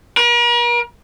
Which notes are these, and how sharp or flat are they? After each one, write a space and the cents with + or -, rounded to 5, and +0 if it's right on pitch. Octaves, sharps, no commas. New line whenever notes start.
A#4 +45